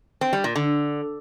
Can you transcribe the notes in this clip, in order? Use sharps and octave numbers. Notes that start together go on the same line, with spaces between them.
C4
G3
A#2
D3